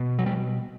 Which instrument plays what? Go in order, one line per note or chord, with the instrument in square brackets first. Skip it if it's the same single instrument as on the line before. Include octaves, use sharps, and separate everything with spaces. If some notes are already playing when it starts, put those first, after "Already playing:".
Already playing: [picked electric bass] B2
F#3
G3